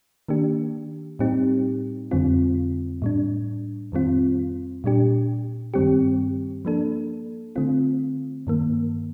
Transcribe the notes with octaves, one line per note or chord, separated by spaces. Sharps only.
D#3 A#3 D4 G4
A2 G3 C4 D#4 G4
F2 D3 G3 C4 F4
A2 G3 D4
F2 D#3 G3 C4 F4
A#2 G3 D4 G4
G2 D#3 G3 C4 G4
F3 A#3 D4 A4
D3 A3 C4 F4
G2 D#3 A#3